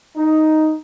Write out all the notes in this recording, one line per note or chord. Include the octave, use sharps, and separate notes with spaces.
D#4